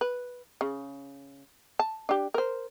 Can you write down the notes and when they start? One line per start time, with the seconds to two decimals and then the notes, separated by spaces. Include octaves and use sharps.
0.01 B4
0.61 C#3
1.79 A5
2.09 D4 G4
2.34 A#4 C5